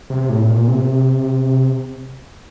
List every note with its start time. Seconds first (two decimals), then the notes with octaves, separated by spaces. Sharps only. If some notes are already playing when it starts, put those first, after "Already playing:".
0.10 C3
0.29 A2
0.49 A#2
0.68 C3